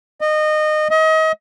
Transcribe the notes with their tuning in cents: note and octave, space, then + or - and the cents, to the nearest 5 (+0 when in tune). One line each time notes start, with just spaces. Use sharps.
D#5 -25
D#5 +30